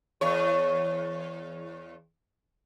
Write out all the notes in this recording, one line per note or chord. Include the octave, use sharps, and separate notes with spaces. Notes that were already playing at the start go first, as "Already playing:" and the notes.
E2 C#5